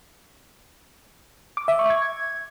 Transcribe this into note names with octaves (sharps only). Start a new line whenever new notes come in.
D6
E5
C#6
G#6